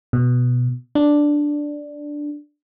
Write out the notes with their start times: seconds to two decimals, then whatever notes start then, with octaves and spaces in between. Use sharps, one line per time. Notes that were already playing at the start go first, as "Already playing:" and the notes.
0.13 B2
0.95 D4